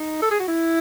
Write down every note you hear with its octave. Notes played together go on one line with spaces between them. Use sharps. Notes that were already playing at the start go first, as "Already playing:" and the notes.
Already playing: D#4
A4
G#4
F#4
E4